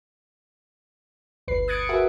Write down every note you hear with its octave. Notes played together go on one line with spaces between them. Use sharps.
G1 D2 B4 C7
D#6 F#6 G#6 A6 C#7 D7
F#4 G#4 A#4 B4 E5 F#5